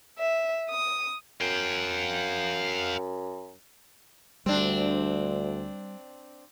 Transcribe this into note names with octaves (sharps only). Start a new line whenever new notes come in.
E5
D#6
F#2 F5 G5
D2 G3 C4 D4